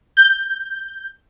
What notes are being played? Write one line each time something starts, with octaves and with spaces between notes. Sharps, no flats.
G6